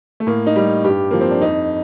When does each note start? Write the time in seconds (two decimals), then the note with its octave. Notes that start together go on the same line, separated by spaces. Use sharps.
0.20 A3
0.27 A2 A#3
0.47 D#4
0.56 G3
0.84 G2 G4
1.11 F3 A#3
1.21 C4
1.31 D4
1.41 F2 D#4